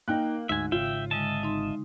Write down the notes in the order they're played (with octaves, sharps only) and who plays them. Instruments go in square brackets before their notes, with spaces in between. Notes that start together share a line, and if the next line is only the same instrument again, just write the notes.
[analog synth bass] A#3 [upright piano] D#4 G5 F#6
[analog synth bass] D2 [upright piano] G#2 [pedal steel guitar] E5 G#5
[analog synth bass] G#1 [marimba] C#3 [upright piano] F4 [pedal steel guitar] E5 G5
[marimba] D3 G#3 [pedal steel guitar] D#5 E5 A5
[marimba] D#4 C6